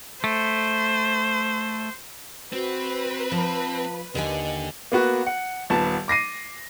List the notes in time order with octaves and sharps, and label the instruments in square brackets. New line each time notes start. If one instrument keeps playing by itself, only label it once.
[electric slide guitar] A3 [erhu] C5
[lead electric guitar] C4 [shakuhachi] F#4 [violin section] B4
[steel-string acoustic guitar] F3 [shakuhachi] A5
[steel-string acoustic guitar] D#2 D#3 G#5 [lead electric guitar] D3 [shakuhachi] D#5
[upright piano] A#3 B3 F#4 B4
F#5
D#1 B3 A5
D6 A#6 C7 D#7